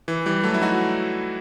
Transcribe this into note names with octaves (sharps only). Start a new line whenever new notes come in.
E3
E3 G3
F#3 A3
E4
D#4 F#4